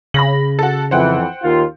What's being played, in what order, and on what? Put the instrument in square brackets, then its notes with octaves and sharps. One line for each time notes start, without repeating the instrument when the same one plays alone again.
[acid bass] C#3 [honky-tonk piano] B5 A#6 F#7
[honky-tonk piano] F#4 A4
[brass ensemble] F2 E3 [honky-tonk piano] C5 F#5 G5
[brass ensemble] D#2 F4